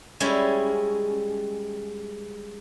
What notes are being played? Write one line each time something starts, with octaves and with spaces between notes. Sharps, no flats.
G3 G#3 C#4 E4